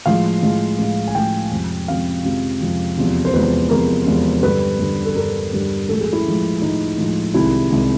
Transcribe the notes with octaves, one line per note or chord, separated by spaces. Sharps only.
A2 F3 G#3 F5
A2 F3 G#3
A2 F3 G#3
G#5
A2 F3 G#3 G5
F2 C3 F3 G#3
F2 C3 F3 G#3 F5
F2 C3 F3 G#3
F2 C3 F3 G#3
E2 C3 F3 G#3
C5
E2 C3 F3 G#3 B4
E2 C3 F3 G#3 A#4
E2 C3 F3 G#3
G2 D3 G3 B4
G2 D3 G3
A4
G2 D3 G3 A#4
G2 D3 G3
A2 F3 G#3 A4
G#4
E4
A2 F3 G#3
A2 F3 G#3 D#4
A2 F3 G#3
C2 C3 D#3 G#3 E4
C2 C3 D#3 G#3